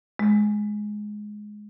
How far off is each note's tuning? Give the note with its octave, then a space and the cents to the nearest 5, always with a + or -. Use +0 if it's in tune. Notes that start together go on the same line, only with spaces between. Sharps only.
G#3 +10